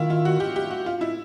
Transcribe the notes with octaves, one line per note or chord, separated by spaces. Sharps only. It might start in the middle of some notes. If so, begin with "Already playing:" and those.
Already playing: D#3 E4 F4
F4
F#4
G4
G4
F#4
F4
E4